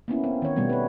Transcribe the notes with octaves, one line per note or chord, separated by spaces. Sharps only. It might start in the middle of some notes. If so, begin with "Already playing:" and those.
A#3 B3 C#4 E4
C4
D#3 C#5
B2 G3 A3 B3
B4 C#5